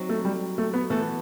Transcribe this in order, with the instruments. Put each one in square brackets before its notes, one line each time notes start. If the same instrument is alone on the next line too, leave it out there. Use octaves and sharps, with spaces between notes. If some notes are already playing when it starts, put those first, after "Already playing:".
Already playing: [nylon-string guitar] F#3 C4 D#4
[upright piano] A3
G3
A3
B3
[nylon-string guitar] E3 B3 F#4 A4 [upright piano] A3